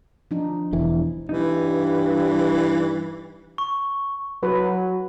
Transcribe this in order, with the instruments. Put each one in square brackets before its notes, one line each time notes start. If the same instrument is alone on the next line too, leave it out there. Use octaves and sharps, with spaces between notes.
[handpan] F3 D4 D#4
[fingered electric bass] E1 E3
[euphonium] G2 [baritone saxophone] E3 [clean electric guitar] D#4
[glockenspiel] C#6
[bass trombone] F#3 [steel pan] B4